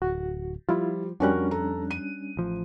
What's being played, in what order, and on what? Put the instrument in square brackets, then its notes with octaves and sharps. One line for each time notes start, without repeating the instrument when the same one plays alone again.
[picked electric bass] D1 [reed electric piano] F#4
[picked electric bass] F3 [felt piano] G3 [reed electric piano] E4 F4
[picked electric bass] F2 [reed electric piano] G3 C#4 D4 [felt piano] F#4 A#4 F#6
[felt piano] A4 A#5
D#7
[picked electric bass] A1 F3